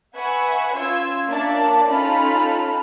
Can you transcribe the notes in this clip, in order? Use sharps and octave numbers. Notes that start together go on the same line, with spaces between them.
B4 E5 F#5 G#5 C#6
C#4 F4 C6 E6 G#6
A#3 D4 C#5 D5 E5 A5
C#4 D#4 F4 A4 B5 F6